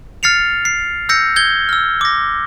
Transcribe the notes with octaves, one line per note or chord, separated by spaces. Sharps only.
F6 A6 C7 C#7 F7
C7
E6 G6 A#6 C#7
G6 G#6 G7
E6 F6
D6 A#6